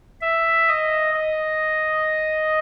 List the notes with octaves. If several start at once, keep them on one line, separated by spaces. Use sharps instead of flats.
E5
D#5
D#5